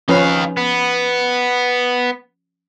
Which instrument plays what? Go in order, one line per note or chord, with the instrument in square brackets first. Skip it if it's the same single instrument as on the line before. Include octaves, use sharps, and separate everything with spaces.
[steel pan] F3 C#4 B4 [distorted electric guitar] D#4 F5
[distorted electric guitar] B3